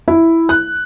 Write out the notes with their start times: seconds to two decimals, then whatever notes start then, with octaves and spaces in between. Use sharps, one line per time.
0.08 E4
0.49 F#6